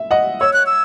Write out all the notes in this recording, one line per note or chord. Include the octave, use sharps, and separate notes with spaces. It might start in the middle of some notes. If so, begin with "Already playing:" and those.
Already playing: E5
D#5 F#5
C#5 E6
F#6
E6